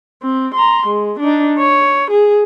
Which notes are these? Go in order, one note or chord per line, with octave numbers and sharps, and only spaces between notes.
C4
A#5 C6
G#3
D4 D#4
C#5
G#4